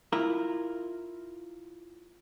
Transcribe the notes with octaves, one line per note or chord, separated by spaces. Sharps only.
E4 F4 A#4